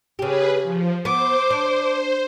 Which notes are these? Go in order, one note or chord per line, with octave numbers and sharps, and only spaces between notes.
C#3 G4 G#4 B4
F3
B3 C5 D6
D4